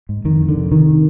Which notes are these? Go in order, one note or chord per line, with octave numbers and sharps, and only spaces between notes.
G#2
F2 D#3
F2
D3
C3
C3 D#3